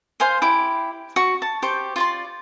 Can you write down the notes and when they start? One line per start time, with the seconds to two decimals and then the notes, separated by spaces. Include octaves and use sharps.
0.20 C5 F5 G#5 C6
0.42 E4 G4 D6
1.16 F#4 C#6
1.42 A5
1.62 G4 C5 C#6
1.96 F4 D5 C6